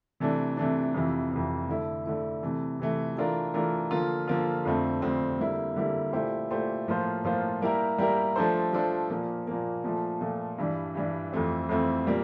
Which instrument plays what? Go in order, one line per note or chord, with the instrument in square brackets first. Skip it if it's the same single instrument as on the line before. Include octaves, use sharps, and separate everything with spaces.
[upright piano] C3 E3 A3 D4
C3 E3 A3 D4
F2 C3 E3
F2 C3 E3
D3 A3 E4
D3 A3 E4
C3 E3 A3
C3 E3 A3
E3 A3 D4 F4 A#4
E3 A3 D4 F4 A#4
D3 F3 A#3 F4
D3 F3 A#3 F4
F2 D3 A3 C4
F2 D3 A3 C4
D3 G3 A#3 E4
D3 G3 A#3 E4
A#2 A3 E4 G4 C5
A#2 A3 E4 G4 C5
A2 F3 A#3 F4 C5
A2 F3 A#3 F4 C5
G3 A#3 E4 G4 A#4
G3 A#3 E4 G4 A#4
F3 A3 D4 A4 C5
F3 A3 D4 A4 C5
A#2 F3 A#3
A#2 F3 A#3
A#2 F3 A3
A#2 F3 A3
G2 E3 G3 D4
G2 E3 G3 D4
F2 E3 A3 C4
F2 E3 A3 C4
A#2 G3 A#3